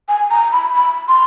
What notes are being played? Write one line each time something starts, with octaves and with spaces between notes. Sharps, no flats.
G#5
A#5
B5
B5
C6